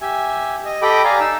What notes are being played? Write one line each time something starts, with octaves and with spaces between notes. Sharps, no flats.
G4 E5 G#5
D#5
G4 A4 D#5 G5 B5 D6
D5 F5 G#5 A#5
D#4 E6